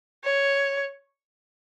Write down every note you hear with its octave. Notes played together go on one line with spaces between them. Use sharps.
C#5